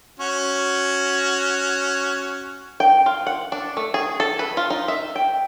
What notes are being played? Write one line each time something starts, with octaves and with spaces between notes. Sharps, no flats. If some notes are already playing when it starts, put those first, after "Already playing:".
C#4 F#4
G5
F4
F#5
D4
A3
G#4
A4
B4
F4
D#4
E5
G5